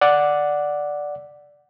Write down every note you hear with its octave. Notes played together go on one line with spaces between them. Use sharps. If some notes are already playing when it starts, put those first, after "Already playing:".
D5 F#5